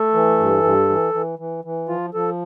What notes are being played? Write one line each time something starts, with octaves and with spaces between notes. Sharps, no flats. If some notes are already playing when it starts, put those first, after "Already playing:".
Already playing: A3 A4
E3
G2
G2
E3
E3
E3
E3
F3 F4
F3 A4